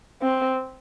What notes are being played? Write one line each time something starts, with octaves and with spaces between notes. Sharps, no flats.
C4